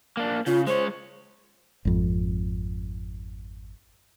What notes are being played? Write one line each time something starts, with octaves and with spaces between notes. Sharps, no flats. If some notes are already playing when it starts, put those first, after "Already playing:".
A#3 D4
C#3 F4
G#3 C5 C#5
G#1 F2